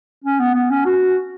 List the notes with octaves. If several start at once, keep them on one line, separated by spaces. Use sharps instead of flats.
C#4
B3
B3
C#4
F#4